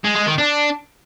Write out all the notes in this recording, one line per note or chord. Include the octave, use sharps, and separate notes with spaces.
G#3
G#3
D#3
D4